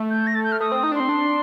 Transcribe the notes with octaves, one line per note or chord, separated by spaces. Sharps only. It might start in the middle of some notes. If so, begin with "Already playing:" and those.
Already playing: A3
G6
A#6
A6
G6
F6
A3 D#6
C4
D#4
D4
C4 C6
D4